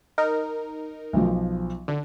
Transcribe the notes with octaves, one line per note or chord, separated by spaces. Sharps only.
D#4 A#4
B1 F3
D3 D4